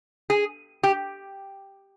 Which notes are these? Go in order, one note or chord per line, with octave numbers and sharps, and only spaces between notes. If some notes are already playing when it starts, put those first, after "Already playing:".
G#4
G4